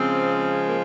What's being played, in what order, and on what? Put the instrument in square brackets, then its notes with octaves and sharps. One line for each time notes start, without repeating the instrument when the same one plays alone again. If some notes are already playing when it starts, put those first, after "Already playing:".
Already playing: [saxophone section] C#3 F3 G#3 C4
A#3